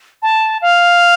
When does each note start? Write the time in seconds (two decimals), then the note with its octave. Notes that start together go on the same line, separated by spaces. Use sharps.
0.22 A5
0.62 F5